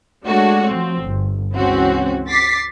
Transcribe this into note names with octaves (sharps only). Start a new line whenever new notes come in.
G#3 A3 D4 F#4 C#5
F3 C4
G1
C#2 E3 C4 C#4 F#4
D6 A6 B6 C7